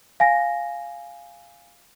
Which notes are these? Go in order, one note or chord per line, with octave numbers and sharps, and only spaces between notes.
F5 G#5 A#6